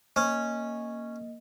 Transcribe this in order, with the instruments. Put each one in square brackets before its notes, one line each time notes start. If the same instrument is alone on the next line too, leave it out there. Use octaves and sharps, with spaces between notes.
[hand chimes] A#3 D#5 [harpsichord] C#4